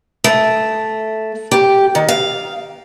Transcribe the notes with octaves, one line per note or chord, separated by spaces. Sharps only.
A3
G4
D#3
F5